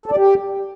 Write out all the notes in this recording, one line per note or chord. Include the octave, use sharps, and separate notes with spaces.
A4
D5
G4